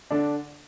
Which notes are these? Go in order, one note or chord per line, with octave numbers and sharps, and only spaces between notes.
D3 D4